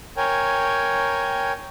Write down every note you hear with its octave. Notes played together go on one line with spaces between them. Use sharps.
A#4 C#5 G5 G#5